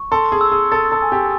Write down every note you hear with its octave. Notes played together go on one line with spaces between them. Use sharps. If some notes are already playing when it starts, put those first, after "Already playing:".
Already playing: C#6
A4 C6
G#4
E6
G#4
A4 A6
A4
G#5
G4